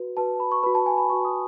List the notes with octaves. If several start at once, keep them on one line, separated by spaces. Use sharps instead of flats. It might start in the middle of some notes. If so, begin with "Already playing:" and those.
Already playing: F#4 B4
F#4 B4 A5
B5
C#6
F#4 B4 B5
A5
G#5
B5
F#4 B4 C#6
D#6